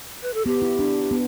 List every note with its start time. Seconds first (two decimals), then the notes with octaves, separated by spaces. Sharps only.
0.22 B4
0.34 A4
0.46 B3 G4
0.62 E4
0.79 D4
1.11 B3